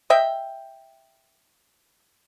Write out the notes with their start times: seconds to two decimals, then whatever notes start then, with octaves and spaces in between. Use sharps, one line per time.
0.10 D#5 E5 G5